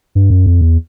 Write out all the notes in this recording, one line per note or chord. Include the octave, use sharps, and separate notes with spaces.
G2
F#2
F2
E2